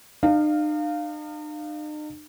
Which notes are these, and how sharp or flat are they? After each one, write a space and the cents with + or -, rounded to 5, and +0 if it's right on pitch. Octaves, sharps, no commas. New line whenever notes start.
D#4 -45 F5 +0